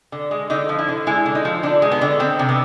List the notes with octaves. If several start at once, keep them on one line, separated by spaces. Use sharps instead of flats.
D3
G#3
D3 D#4
F3
E4
D3
G#3 E4
D3
D#4
F3
D3 D4
G#3
B3
D3
D#3 C4
C3
B3